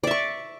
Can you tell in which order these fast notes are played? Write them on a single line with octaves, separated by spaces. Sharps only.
D5 E5 C#6